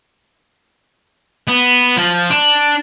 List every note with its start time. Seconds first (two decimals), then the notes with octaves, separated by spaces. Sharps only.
1.48 B3
1.97 F3
2.30 D4